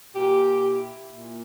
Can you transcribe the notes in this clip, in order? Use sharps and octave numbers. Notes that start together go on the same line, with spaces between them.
A#2 G4
E4
A#2